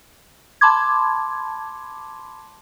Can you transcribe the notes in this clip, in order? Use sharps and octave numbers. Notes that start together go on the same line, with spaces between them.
A5 B5 C6 D6 G#6